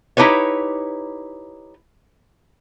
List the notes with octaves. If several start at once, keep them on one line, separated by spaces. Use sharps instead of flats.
D#4 E4 G4 B4 C#5